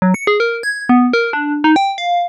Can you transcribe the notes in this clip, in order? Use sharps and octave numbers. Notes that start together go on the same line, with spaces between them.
F#3
C#7
G#4
A#4
G#6
B3
A#4
D4
D#4
G5
F5